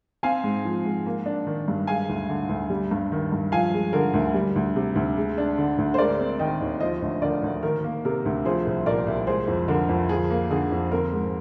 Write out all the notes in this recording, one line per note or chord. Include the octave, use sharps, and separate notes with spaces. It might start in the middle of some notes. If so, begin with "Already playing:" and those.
C4 F5 G#5
G#2
F3
G#2
A#3
D4
D#3
G2
G#3 F5 G#5
D2
D3
D2
G3
G2
D#3
G2
F3 F5 G#5
G#3
D3 A#4
D2
G3
D2
C3
D2
G#3
D4
D3
D2
C5
G#3 A#4 D5
C4
D#3 D#5 G5
D#2
F3 C5 D#5
D2
D3 A#4 D5
D2
D#3 A#4
A#3
C3 A#4
D2
F3 G#4 C5
C2
A#2 A#4 D5
C2
G#3 G#4 C5
F2
D3 A#4
F2
F3 G#4
A#3
D3 G#4
F2
C4 A#4
G#2